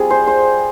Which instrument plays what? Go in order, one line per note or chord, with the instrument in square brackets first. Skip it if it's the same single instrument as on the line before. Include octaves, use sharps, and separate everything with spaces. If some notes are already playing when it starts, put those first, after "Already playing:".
Already playing: [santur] G3 C4 F4 G#4
C5
C5